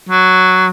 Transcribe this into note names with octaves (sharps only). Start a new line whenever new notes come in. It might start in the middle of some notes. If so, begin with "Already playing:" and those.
F#3